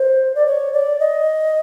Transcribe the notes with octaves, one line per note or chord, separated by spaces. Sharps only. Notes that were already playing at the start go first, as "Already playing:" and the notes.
Already playing: C5
D5
C#5
D5
D#5